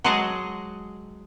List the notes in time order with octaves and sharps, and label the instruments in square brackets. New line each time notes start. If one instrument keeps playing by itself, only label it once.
[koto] F#3 G#3 F#4 G#4 D#5 A5